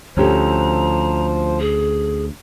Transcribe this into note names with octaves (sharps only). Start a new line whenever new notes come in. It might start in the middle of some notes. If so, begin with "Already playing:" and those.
D2 F3 C#4 G4 A4 C5 A#5
G#4